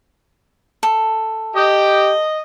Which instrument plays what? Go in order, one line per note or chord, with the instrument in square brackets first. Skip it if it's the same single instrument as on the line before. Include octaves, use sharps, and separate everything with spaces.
[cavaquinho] A4
[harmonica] G4 G5 [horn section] D#5